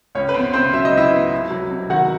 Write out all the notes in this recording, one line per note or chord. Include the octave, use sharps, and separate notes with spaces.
C#2 C#4 C#5
B4
B3 C4 C5
C#3 C4 C5
F#3 E5
D#5
C#2 E4 E5
B3
C2
F#3
C3
D#3 F#4 F#5